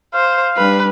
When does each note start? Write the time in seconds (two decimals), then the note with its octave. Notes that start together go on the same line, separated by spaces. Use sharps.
0.14 C5 F5
0.57 G3 D4 B4